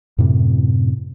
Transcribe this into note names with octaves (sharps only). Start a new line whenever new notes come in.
F#2 A2 C3